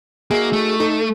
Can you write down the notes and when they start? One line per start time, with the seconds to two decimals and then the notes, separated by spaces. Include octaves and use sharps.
0.31 A#3 D#4 F#4 G#4 E5
0.53 A3
0.80 D#4 A4